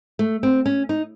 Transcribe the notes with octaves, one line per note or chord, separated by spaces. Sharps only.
A3
C4
C#4
D#4